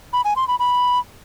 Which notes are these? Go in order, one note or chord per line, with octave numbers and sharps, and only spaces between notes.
B5
G#5
C6
B5
B5